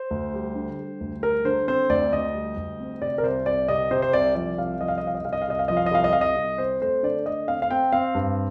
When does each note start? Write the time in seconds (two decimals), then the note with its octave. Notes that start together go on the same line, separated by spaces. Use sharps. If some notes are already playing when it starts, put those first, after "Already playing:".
Already playing: C5
0.11 D2
0.34 G3
0.55 D3
0.79 G3
1.01 D2
1.23 G3 A#4
1.45 D3 C5
1.68 C4 C5
1.89 D2 D5
2.12 D2 D#5
2.35 G3
2.57 D2
2.80 C4
3.02 C3 D5
3.18 A#4
3.23 C2 C5
3.46 C2 D5
3.68 C3 D#5
3.91 C3 C5
4.02 C5
4.13 C2 D5
4.35 F3 D5
4.58 C2 F5
4.80 F3 D#5
4.88 F5
4.98 D#5
5.02 C2 F5
5.15 D#5
5.25 C2 F5
5.33 D#5
5.42 F5
5.48 C2 D#5
5.59 F5
5.68 F3 D#5
5.77 F5
5.86 D#5
5.91 C2 F5
6.04 D#5
6.13 C2 F5
6.21 D#5
6.36 C2
6.58 C4 C5
6.81 A3 C5
7.03 D3 D5
7.26 A3 D#5
7.48 C4 F5
7.62 F5
7.70 C4 G5
7.92 C4 F5
8.15 G2